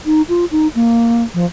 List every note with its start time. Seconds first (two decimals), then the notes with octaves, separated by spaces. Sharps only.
0.06 D#4
0.29 F4
0.51 D#4
0.75 A#3
1.34 F3